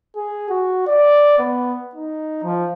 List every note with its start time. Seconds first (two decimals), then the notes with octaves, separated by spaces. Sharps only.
0.16 G#4
0.49 F#4
0.87 D5
1.39 B3
1.95 D#4
2.44 F3